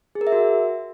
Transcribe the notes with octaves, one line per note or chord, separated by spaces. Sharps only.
G#4
A#4
E5
F#4